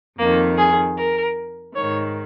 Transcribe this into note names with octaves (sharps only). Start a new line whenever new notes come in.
F2 D#3 A#3
G#4
A#4
G#2 D#3 C#5